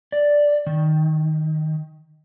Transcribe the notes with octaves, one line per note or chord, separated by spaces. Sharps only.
D5
D#3